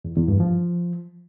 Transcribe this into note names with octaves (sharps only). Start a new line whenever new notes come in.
E2
E2
G2
F3